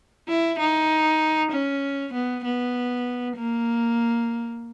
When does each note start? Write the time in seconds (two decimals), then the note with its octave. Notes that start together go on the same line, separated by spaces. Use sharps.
0.28 E4
0.59 D#4
1.52 C#4
2.13 B3
2.44 B3
3.37 A#3